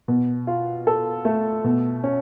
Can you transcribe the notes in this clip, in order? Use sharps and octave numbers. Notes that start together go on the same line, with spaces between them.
B2
F4
A4
A3
B2
C#4